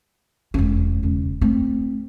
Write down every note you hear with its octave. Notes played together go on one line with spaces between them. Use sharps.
E1 C#4
E1 C#2
A3 C4